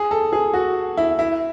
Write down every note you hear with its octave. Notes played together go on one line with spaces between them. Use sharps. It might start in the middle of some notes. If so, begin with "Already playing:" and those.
Already playing: G#4
A4
G#4
F#4
E4
E4